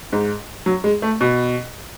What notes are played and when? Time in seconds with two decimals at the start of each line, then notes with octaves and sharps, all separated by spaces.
0.13 G#2
0.66 F#3
0.84 G#3
1.02 A3
1.21 B2